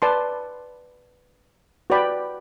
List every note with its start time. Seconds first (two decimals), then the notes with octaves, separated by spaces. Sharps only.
0.02 B4 D5 A5 C6
1.90 F#4 B4 D5 G5 B5